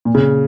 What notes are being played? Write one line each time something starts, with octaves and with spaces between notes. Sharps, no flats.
A#2
C#3